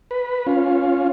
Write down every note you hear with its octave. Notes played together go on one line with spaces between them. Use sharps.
B4
C#4 F4